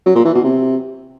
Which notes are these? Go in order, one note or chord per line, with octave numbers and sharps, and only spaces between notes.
F#3
A#2
E3
B2
C3